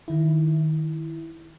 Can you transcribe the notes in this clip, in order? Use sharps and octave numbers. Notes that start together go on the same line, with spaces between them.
D#3 E4